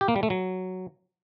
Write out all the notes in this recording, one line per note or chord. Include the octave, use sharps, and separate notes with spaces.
G4
A#3
G3
A3
F#3